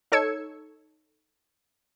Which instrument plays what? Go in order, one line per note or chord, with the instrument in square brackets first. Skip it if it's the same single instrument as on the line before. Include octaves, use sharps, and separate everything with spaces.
[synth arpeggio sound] D#4 A4 C#5 E6 G#6 C#7